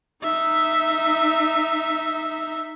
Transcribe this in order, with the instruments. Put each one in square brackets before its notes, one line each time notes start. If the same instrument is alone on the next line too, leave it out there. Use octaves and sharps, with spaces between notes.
[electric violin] D#4 E5